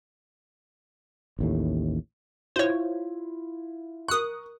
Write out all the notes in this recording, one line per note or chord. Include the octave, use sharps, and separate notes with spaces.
A1 D#2 A2
E4 F4 C5 C#5
A#4 C#6 D#6 F#6